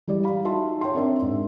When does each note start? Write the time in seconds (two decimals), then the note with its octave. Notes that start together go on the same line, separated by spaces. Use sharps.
0.07 E3 G3 G4 D5
0.24 F5 B5
0.44 D#4 F4 F#4 E5 A5 C6
0.81 C#5 G5 C6
0.95 C4 D4 A#4 D5 E5
1.22 G#2